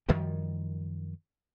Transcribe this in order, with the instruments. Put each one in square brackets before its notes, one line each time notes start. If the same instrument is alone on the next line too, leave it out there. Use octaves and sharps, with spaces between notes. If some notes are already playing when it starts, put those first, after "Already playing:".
[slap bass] F#2 D#3 F3 G3